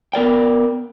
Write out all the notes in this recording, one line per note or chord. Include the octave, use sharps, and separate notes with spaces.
B3 A#4 D5 G5